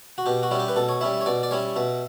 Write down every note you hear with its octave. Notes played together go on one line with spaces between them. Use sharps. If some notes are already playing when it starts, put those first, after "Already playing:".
F#4
B2 G4
F#4
G3 C#4 E4
G4
B4
B2 A4
C#5
G3 C#4 E4 E5
E5
C#5
B2 D5
D5
G3 C#4 E4 C#5
B2 E5